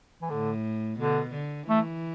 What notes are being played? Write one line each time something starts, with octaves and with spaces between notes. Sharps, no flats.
E3
A2 D3
B2 D3
D3
E3 A3